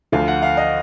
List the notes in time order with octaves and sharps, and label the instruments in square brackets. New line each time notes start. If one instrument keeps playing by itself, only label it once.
[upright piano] D2 D3 F3 [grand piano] F5
[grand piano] F#5
F5
D#5